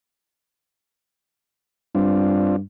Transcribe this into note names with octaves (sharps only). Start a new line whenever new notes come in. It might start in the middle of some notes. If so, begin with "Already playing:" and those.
G2 C4 D4 F4